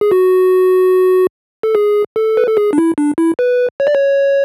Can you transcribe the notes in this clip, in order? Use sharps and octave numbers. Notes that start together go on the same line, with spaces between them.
G#4
F#4
A4
G#4
A4
B4
A4
G#4
D4
E4
D4
E4
B4
C#5
D5
C#5